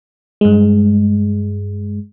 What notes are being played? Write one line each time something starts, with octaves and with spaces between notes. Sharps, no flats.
G2 G#3